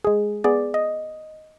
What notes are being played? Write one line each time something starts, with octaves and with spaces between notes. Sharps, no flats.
G#3 G#4
B3 G#4 D5
D#5